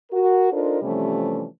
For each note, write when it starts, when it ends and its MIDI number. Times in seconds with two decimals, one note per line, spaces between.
0.11 0.51 66
0.11 0.51 70
0.51 0.79 62
0.51 0.79 63
0.51 0.79 65
0.51 0.79 69
0.51 0.79 70
0.51 0.79 72
0.81 1.44 48
0.81 1.44 52
0.81 1.44 53
0.81 1.44 55
0.81 1.44 57
0.81 1.44 61